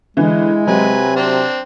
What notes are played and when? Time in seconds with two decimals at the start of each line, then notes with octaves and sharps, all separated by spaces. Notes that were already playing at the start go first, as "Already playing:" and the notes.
0.17 D3 E3 G#3 E4
0.67 C3 F#3 B4 G#5
1.16 C4 D4